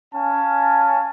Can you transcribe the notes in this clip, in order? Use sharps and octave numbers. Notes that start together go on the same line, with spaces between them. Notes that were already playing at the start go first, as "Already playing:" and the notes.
C#4 F5 G#5 A5